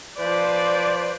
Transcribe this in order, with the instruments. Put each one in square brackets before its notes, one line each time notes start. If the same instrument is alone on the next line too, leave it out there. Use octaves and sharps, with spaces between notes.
[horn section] F3 B4 C5 [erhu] D5